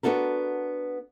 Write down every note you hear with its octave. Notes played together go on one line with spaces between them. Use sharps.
B3 D4 F#4 A4 A#4